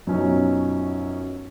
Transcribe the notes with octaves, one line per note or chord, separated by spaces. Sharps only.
F#2 B2 F3 F#3 C#4 D#4